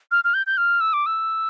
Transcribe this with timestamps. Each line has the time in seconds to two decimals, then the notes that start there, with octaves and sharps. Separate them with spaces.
0.12 F6
0.24 F6
0.34 G6
0.47 G6
0.57 F6
0.81 E6
0.93 D6
1.06 E6